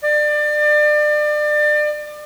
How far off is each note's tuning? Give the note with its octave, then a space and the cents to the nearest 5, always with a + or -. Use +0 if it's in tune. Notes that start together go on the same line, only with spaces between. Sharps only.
D5 +30